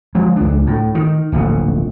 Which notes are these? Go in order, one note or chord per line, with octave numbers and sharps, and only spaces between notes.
F3 G#3
C#2 D4
A2
D#3
D1 A#1 B2